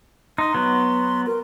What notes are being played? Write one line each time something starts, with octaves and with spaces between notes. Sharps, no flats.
D#4 C6
F#3 B3
A#4